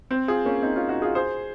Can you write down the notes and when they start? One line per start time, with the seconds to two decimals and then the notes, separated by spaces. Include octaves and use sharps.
0.11 C4
0.28 F4 G#4
0.45 A#3 C#4
0.62 C4 D#4
0.75 C#4 F4
0.89 D#4 F#4
1.02 F4 G#4
1.15 G#4 C5